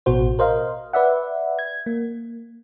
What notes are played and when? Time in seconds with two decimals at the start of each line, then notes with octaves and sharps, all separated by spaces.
0.06 A1 B2 F#4 C5
0.39 A#4 C5 D#5 F5
0.93 B4 D5 E5 F#5
1.59 G#6
1.86 A#3